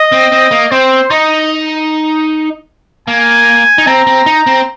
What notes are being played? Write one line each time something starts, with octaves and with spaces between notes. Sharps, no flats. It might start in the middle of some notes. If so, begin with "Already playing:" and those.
Already playing: D#5
C4
C4
A#3
C4 C5
D#4 D#5
A#3 G#5
D#4
C4 A#5
C4
D#4
C4